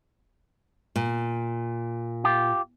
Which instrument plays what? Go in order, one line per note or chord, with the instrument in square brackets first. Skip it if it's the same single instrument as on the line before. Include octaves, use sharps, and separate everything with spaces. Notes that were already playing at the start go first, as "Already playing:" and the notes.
[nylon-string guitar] A#2
[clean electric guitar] F4 G4